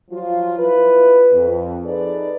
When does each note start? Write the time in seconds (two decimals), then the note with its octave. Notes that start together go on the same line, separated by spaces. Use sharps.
0.11 F3 F#3 F4
0.59 E4 F4 B4
1.31 F2
1.85 D#4 G#4 A4 B4 D5